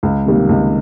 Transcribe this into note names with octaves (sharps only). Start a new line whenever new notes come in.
C#2
C3 D#3 G3 A#3
C#2